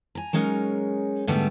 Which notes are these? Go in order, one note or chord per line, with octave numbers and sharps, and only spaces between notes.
G#5 A#5
F#3 G#3 C#4 D#4 A#4
G#2 D3 G3 A3 B3